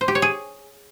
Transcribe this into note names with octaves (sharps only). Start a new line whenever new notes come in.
C5
G4
C#5
G#4